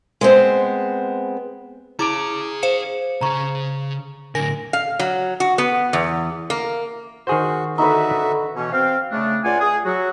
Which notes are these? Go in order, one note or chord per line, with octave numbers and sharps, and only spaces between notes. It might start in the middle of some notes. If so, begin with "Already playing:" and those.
G#3 B3 C4
E4 G#4 C#5 A#5 D6 D7
C5 F5 C#7 E7
C#3 G#4 A#5 C#6
A2 D3 A#4 G#5 A#6
F5
F#3
F#4
B3
E2
A#3
D#3 F#4 G#4 C5
D3 D#4 F#4 B4 E5
B2 E3 C#4
C4 F5
C#3 A3 D4
C#2 F4 D5 F#5 G#5
G#4
F#3 F#4